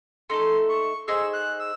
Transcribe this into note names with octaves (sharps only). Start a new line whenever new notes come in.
A3 D#4 A4 C6
C#6
D#4 G#4 C5 E6
F#6
E6